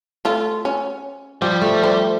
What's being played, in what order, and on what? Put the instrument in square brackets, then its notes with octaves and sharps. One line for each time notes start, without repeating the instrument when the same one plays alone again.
[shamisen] A3 F4
C#4
[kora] F3 G4 [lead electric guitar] G3
[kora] A3
[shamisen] C5